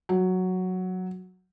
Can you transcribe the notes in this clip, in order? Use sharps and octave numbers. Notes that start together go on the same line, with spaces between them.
F#3